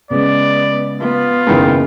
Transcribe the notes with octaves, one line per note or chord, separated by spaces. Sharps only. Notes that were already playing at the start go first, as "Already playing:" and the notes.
C#3 G#3 B3 D5
B3 F4
F#1 G#2 D#3 E3 B5